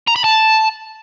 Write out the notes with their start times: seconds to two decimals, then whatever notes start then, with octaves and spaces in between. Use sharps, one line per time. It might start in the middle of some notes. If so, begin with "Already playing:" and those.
0.07 A#5
0.16 B5
0.24 A5